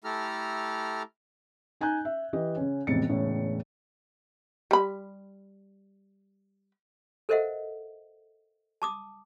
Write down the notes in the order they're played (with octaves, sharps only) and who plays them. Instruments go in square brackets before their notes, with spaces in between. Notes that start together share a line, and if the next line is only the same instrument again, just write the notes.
[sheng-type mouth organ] A3 E4 G4 A4 A#5 F6
[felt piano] D#4 G#5 A#5 F#6 G6
E5
E3 G4 D#5
C#3 C#4
E1 F2 A2 C3 A6 C#7
E1 A2 C#3 C#5
[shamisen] G3 B5
[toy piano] A4 A#4 C5 D#5 E5 F#5
A5 D6 D#6